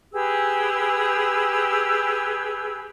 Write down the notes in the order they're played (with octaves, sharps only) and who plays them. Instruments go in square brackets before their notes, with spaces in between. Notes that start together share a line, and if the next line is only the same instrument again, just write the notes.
[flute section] G4 G#4 B4 E6